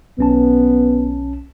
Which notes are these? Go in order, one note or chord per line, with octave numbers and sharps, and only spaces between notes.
B1 B3 C#4 A5